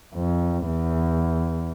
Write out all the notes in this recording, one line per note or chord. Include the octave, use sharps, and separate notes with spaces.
F2
E2